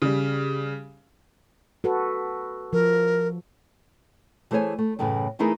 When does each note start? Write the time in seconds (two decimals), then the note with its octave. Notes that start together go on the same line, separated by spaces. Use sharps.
0.02 C#3 G3
1.84 F#4 A4 B4
2.73 F3 A#4
4.51 E3 A3 G#4 C5 C#5 G#5
4.79 A3
4.99 F#2 A2 C#3 E3 A3
5.39 E3 A3 D#4 E4 G#4 A#4